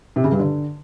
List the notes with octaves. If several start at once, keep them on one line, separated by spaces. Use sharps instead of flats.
C3
C#3
G2
D3